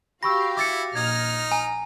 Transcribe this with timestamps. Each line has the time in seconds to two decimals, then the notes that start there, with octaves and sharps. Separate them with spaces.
0.23 F#4 G4 F5 B5 C#6 E6 A#6
0.57 E4 D6 A6 C#7
0.95 A#1 D#4 F6 G#6
1.52 G#5 A#5